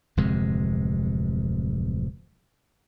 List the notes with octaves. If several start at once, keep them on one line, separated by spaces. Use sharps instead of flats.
D1 F2 C3 G#3